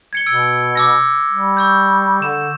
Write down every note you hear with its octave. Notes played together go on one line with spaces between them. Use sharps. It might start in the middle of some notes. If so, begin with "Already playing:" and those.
G#6 C#7 G7
B2 E6 G#6 D7
D6 E6 A#6
G3
C#6 E6 G6
D3 E7